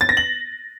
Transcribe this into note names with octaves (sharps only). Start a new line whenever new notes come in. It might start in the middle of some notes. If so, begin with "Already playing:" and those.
A6
A#6
F#7